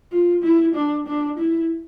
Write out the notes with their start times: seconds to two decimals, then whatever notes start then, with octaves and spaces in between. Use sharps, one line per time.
0.12 F4
0.43 E4
0.74 D4
1.07 D4
1.38 E4